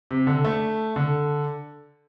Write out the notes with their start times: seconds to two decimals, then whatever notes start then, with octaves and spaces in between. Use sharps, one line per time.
0.11 C3
0.27 D3
0.45 A3
0.96 D3